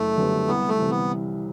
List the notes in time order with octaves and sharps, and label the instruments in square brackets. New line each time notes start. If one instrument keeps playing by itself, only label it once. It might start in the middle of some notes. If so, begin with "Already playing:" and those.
Already playing: [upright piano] F#1 [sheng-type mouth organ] A3
[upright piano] F#2 D3 G3 B3
[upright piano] C2 [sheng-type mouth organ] B3
[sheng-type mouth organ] A3
[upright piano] C3 E3
[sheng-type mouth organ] B3